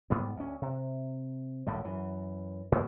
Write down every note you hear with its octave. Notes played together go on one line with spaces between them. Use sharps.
G#2 G3 B3
D2 C#4
C3
G#1 D2 A2 G3
F#2 E3
G#2 B2 A#3